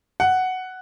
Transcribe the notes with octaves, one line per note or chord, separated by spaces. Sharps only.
F#5